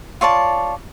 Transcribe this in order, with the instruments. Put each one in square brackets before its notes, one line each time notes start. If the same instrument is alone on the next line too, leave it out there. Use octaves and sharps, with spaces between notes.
[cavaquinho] F4 C#5 D5 A5